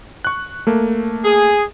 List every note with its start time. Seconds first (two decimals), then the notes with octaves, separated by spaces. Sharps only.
0.25 C#6 F#6
0.67 A3 A#3
1.25 G#4